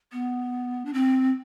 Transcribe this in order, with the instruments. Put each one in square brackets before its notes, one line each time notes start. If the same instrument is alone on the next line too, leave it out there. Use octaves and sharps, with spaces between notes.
[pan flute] B3
D4
C4